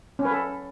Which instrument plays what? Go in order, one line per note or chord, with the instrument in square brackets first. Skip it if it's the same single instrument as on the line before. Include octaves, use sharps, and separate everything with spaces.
[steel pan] C#4
B4
A4